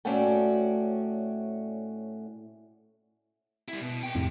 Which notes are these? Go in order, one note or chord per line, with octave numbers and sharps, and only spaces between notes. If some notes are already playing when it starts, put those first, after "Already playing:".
A2 A3 C#4 F#4 D5 G5
G3 E4
B2
F#4 G5
F2 A2 C3